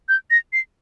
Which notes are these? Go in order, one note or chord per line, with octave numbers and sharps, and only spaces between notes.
G6
A#6
C7